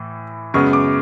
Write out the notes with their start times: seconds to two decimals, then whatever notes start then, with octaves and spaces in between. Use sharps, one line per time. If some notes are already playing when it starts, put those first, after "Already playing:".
Already playing: A2 E3
0.54 F#2 C#3 G#3 B3 C#6
0.73 D6